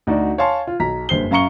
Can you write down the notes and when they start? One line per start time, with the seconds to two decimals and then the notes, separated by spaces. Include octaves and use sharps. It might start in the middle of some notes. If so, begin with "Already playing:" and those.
0.07 D2 D#4 F#4 D5
0.38 C#5 F5 G#5 A5 C6
0.67 F4
0.80 B1 A#5 B6
1.09 F#1 G2 C5 C7 G7
1.31 F#2 F5 A#5 C#6 C#7 G7